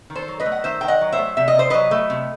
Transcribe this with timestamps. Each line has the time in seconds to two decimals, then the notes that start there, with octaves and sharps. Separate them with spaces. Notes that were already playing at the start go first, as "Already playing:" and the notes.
0.10 D#3
0.15 A4 C5
0.28 F#3
0.40 B4 D#5
0.46 A3
0.52 F#5
0.64 D#3 C5 E5
0.81 D#3 G5
0.88 D#5 F#5
1.01 F#3
1.12 C5 E5
1.18 A3
1.37 C3 E5
1.48 D#5
1.55 C3 C5
1.70 F#3 B4 D#5
1.91 A3
2.10 C3